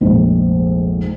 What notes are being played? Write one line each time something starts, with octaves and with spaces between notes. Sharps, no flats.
F1 A#1 G#2